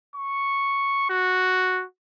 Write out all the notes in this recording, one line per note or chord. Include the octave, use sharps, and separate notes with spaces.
C#6
F#4